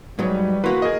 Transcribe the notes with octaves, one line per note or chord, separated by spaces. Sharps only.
G#2 F#3 G3 B4 C#5
E3 A#3 F#4 B4 C6
G#4 A#4 D#5